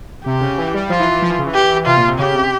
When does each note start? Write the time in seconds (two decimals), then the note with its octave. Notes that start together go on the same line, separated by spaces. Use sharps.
0.25 C3 G4
0.41 C#3
0.58 E3
0.74 G3
0.90 F3 F4
1.00 E3
1.12 E3
1.22 F3
1.30 E3
1.39 C#3
1.47 E3
1.54 G4
1.86 C3 F4
1.97 A#2
2.08 C3
2.19 C#3 G4
2.34 C3